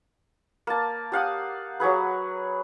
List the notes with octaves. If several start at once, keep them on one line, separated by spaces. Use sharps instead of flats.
A#3 A5
G4 F5 F#5 D#6
F#3 F#4 G#4 B4